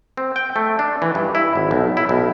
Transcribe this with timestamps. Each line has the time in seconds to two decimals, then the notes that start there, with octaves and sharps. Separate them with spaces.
0.17 C4
0.36 G5
0.56 A3
0.79 D4
1.02 E3
1.15 G2
1.35 E4
1.55 G#1
1.71 B1
1.97 E4
2.09 B1